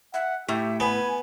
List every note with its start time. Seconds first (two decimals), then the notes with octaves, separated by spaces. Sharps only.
0.14 E5 F#5
0.48 A2 G4 E5
0.80 B3 G#5 B5